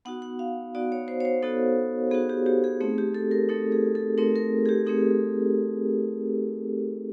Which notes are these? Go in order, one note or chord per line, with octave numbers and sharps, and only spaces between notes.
B3 D#4 F#4 F#5
F#5
F5
B3 D#4 F#4 D5
C#5
C5
C#5
C5
B3 D#4 F#4 A4
B3 D#4 F#4 G#4
G4
G4
G#4
A3 C4 D#4 G#4
G4
A4
A#4
A3 C4 D#4 A4
G#4
A4
A3 C4 D#4 A#4
A#4
G#4
G4
A3 C4 D#4 G#4